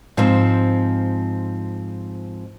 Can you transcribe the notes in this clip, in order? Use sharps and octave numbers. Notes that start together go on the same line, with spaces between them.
G#2 F3 C4